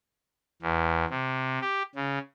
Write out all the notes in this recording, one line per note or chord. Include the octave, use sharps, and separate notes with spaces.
E2
C3
G4
C#3